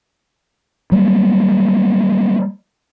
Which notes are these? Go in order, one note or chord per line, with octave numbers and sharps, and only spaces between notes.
F#3 G3 A#3